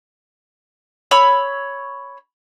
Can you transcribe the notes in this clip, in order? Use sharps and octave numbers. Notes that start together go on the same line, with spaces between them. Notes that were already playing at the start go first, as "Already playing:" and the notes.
C#5 B5 E6